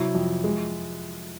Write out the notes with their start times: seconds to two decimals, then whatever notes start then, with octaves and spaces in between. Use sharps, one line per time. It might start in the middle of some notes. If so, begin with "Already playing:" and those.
Already playing: C3 F#3 E4
0.15 F2
0.44 G#3